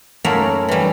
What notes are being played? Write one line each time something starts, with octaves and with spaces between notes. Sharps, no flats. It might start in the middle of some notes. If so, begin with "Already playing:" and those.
F#2 A3 A#3 C#4 E4 A#4
E3 G3